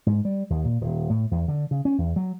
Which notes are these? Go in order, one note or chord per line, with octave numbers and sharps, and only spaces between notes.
G#2
G3
D#2
A#2
D#1
A2
E2
D3
C#3
C#4
E2
F#3